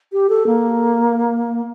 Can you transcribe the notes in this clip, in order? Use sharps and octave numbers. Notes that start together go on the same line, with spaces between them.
G4
A4
A#3